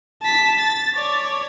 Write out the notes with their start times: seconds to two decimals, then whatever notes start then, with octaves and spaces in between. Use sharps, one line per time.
0.22 A5 B6
0.59 A6
0.95 C#5 D5